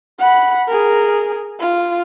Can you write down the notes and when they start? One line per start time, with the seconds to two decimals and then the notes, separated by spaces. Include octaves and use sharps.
0.19 F#5 B5
0.68 G#4 A#4
1.60 F4